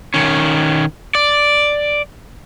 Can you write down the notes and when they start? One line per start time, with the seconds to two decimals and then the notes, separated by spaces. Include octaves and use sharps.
0.14 D#3 C#4
1.15 D5